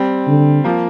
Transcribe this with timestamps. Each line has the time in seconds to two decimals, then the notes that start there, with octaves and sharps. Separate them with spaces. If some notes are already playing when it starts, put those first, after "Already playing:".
Already playing: G3 C4
0.28 D3
0.64 F3 A#3